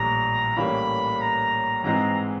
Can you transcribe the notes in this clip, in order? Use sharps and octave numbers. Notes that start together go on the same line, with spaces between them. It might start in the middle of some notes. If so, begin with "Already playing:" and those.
Already playing: A#1 A2 E3 G3 A#5
A2 E3 G3 A#3 C#4 B5
A#5
G#2 E3 G#3 C4 A#5